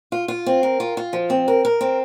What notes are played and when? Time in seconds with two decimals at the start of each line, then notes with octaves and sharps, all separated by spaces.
0.12 F4
0.28 F4
0.46 C4
0.63 A#4
0.80 F4
0.97 F4
1.13 F3
1.30 C4
1.48 A#4
1.65 A#4
1.81 C4